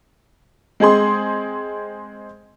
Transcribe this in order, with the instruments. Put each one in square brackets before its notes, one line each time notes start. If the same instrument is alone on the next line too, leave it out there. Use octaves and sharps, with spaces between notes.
[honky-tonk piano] G#3 C4 G#4 C6